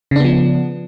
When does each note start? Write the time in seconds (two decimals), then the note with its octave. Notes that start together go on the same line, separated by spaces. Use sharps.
0.11 C#3
0.16 D4
0.20 B3
0.24 F3